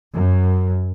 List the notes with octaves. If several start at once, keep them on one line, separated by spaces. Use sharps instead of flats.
F#2